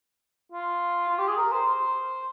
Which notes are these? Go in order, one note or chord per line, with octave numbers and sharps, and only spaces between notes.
F4
F4
G4
G#4
A#4
C5
C5